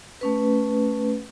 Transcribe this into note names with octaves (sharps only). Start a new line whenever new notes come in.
A3 C#4 B4